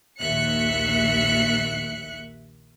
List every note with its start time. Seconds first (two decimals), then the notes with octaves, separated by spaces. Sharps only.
0.19 A#1 D#2 E5 F#6 C#7